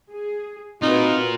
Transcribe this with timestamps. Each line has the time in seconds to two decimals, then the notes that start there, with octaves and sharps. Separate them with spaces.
0.11 G#4
0.82 C4 D#4 F4 F#4 A#4 B4